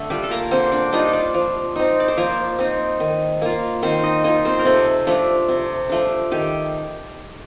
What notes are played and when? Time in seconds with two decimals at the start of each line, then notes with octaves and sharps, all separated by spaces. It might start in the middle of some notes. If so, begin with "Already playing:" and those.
Already playing: D3 A3
0.10 G3 D4 F4 G4
0.23 A4
0.31 A#3 A#4
0.51 D3 C4 C5
0.72 D4 D5
0.93 G3 D4 D#4 F4 D#5
1.13 D4 D5
1.34 F3
1.76 C4 D#4
2.00 D5
2.08 C5
2.17 F3 A#3 A#4
2.59 C4 D#4
3.00 D#3
3.42 A#3 F4
3.82 D#3 C4 C5
4.03 D#4 D#5
4.24 A#3 D#4 F4 D#5
4.45 C4 C5
4.59 A#4
4.65 C3 A3 A4
5.07 F3 A3 D4
5.48 C3
5.89 F3 A3 D4
6.31 D#3 G4